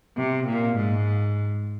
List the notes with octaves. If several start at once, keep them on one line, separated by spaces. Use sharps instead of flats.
C3
A#2
G#2